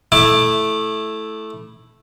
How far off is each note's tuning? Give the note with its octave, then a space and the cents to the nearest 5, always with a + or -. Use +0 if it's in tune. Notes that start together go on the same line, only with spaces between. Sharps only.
A3 -10 E4 +0 D6 +20